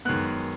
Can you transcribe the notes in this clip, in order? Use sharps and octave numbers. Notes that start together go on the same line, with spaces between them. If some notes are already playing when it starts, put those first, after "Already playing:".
F#2 D#3 G#3 B3 F#6